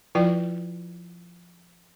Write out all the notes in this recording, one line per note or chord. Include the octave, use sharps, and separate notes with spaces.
F3 E4 F4 B4 D5 G5